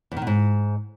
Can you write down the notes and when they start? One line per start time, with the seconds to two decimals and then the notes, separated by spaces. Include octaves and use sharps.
0.12 E2
0.17 D#3
0.22 B2
0.27 G#2